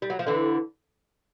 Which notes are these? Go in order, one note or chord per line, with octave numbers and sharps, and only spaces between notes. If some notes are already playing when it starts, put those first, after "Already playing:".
G3
F#3
F3
D3 E3